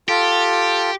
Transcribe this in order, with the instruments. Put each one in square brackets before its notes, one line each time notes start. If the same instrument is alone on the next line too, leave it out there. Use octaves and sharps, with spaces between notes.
[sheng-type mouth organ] F4 A4 [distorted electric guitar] G4